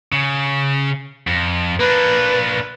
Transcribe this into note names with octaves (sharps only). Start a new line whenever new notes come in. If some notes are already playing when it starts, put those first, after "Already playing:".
C#3
F2
A#3 D4 B4